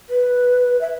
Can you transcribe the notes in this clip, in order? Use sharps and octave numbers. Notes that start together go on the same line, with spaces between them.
B4
E5